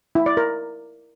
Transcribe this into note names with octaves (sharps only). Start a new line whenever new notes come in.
E4
D5
A#4